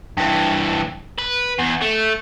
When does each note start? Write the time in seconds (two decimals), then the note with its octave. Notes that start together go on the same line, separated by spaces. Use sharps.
0.17 G2 E3
1.18 B4
1.58 E2
1.81 A3